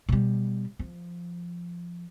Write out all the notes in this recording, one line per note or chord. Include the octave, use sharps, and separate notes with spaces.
B2 G3
F3